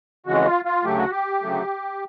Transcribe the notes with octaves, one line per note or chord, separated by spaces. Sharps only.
F2 C#3 E3 G#3 F#4
F4
F4
D2 C#3 F#3 A3 G4
F#4
G4
D2 C#3 F#3 A3